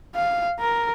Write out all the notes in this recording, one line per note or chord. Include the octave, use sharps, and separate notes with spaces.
F5
A#4